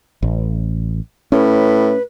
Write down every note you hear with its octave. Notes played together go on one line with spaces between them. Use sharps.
A1
A2 C#4 B4